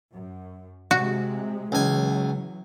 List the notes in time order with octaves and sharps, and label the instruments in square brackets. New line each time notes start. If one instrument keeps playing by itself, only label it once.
[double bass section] F#2
[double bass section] C3 G#3 [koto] F#4
[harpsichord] C#2 G#5 [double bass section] E3 F#3